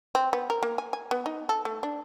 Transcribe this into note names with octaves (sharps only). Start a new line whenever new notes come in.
C4
B3
A#4
A#3
G#5
G#5
B3
D#4
A4
A3
D4